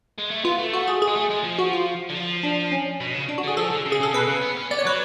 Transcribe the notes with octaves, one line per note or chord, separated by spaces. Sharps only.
G#3
A3
B3 F4
A3
F#4
G#4
G#4
G#3
A3
G#3
F3
F#4
F4
D3
F3
D4
C#4
B2
C#3
D4
F#4
D3 G#4
F3 A4
D3
C#3
G#4
C#3 A4
B2 B4
C#3
B3
C#4
B3 D5
C#5
F#3 B4